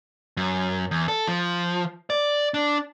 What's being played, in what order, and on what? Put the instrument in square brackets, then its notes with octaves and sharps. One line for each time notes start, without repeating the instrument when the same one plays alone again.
[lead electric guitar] F#2
E2
A4
F3
D5
D4